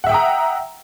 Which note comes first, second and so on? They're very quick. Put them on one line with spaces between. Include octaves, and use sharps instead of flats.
F#5 E5 G5 D#6 A#5